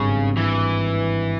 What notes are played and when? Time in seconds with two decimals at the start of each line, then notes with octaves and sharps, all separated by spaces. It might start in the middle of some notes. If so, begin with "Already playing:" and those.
Already playing: G#1 G2 C#3 G3
0.37 E3